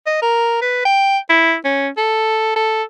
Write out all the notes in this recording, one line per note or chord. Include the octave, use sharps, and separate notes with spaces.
D#5
A#4
B4
G5
E4
C#4
A4
A4